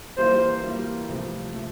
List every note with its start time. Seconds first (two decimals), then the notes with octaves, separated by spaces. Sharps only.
0.17 E3 G3 A#3 F4 C5
0.63 E3 G3 A#3 F4
1.09 C3 F3 A3
1.54 F3 A3